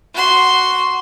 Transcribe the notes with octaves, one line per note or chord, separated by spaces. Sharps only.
F#4 C6